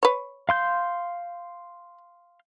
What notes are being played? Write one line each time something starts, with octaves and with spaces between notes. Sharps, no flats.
B4 C#5
F5 C6 G6